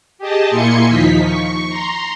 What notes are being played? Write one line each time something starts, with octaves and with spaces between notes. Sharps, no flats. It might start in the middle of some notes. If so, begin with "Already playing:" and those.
G4 G#4 D#5 A5
A#2 A#3 E4 G#5 C6 C#7
D#2 F3 D#4 B6
C#6
A#5 C6